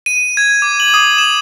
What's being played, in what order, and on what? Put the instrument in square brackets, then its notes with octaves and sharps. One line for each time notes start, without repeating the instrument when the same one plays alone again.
[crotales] D#7
G#6
D6
F#7
D#6
E7